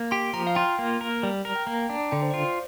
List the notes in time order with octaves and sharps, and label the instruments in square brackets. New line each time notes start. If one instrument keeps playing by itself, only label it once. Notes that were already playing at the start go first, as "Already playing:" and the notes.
Already playing: [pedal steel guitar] A#3
[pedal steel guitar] G4 [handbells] C6
[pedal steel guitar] F3 [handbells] A#5
[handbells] F5
[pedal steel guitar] F4 [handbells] G5
[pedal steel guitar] A#3
A#4
G3
[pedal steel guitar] A#4 [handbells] A#5
[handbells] G5
[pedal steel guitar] A#3 [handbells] A#5
[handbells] G5
[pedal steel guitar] D4 [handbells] A#5
[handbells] A#5
[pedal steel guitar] D3 [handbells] G5
[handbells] C5
D5
[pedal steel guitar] F4 [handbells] C5